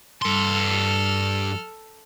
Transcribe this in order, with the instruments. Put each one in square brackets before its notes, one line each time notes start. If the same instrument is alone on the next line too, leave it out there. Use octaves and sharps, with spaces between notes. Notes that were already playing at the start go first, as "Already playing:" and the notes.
[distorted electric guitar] G2 C6 [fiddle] A4 F6